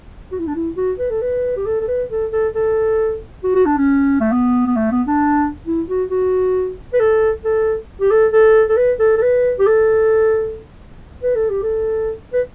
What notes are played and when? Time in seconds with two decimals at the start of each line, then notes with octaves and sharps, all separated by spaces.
0.32 F#4
0.39 E4
0.47 D4
0.55 E4
0.77 F#4
0.98 B4
1.10 A4
1.21 B4
1.56 G4
1.66 A4
1.81 A4
1.88 B4
2.10 A4
2.32 A4
2.55 A4
3.43 F#4
3.55 F#4
3.66 D4
3.77 C#4
4.20 A3
4.32 B3
4.66 B3
4.76 A3
4.92 B3
5.07 D4
5.66 E4
5.88 F#4
6.10 F#4
6.93 B4
6.99 A4
7.44 A4
8.01 G4
8.11 A4
8.32 A4
8.69 A4
8.77 B4
8.99 A4
9.17 A4
9.22 B4
9.59 G4
9.67 A4
11.23 B4
11.35 A4
11.50 G4
11.63 A4
12.33 B4